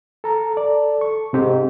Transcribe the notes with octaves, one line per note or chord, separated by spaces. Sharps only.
A4 A#5
A4 D5
C#6
G#2 C3 C4 G4